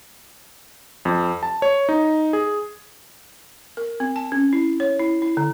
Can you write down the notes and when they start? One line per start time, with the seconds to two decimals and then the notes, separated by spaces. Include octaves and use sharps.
1.05 F2
1.43 A5
1.62 C#5
1.89 D#4
2.33 G#4
3.77 A#4
4.00 C4
4.16 A5
4.32 C#4
4.53 E4
4.80 C#5
4.99 E4
5.22 E4
5.37 D3